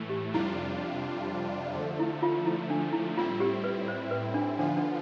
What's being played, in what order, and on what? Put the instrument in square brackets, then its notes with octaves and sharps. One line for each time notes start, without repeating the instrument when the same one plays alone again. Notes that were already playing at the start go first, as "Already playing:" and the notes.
Already playing: [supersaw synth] A2 E3 A3
[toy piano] G4
[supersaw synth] F2 C3 G3 D4 F4 [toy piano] E4
[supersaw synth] D3 F3 A3
[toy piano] E4
F4
E4
D4
E4
[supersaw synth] A2 G3 C4 E4 [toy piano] F4
[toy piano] G4
B4
C5
B4
D4
[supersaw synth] D3 F3 B3 F4 [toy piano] D4
[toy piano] D4